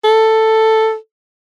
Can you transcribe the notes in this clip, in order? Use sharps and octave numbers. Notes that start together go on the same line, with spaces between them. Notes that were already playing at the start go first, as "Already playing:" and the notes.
A4